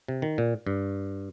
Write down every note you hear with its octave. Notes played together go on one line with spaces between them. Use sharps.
C3
D#3
A#2
G2